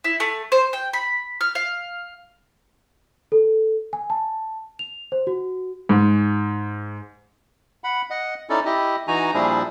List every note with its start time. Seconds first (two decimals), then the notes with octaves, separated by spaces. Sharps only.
0.04 E4
0.20 A3
0.52 C5
0.73 G5
0.93 B5
1.41 F6
1.55 F5
3.32 A4
3.93 G#5
4.10 A5
4.79 F7
5.12 C5
5.27 F#4
5.89 G#2
7.84 F#5 B5
8.10 D#5 F#5
8.50 C#4 D#4 E4 A4 D5
8.65 E4 G4 D#5
9.08 E3 D#4 F#4 G#5 A#5
9.34 A#2 F3 G3 D4 E4 G#4